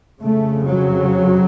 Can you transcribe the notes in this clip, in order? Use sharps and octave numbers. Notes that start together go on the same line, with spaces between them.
F2 C#3 A3
F#3